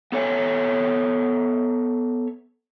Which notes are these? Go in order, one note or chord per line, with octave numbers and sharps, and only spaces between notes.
B3 A4 C#5 E5 G#5